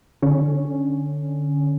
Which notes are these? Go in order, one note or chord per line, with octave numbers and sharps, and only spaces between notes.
D3 C#4